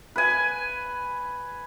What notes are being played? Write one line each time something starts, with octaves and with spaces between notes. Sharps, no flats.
B4 G#5